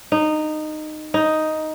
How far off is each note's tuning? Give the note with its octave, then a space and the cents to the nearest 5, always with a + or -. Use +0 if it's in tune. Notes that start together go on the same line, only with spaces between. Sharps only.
D#4 -15
D#4 +5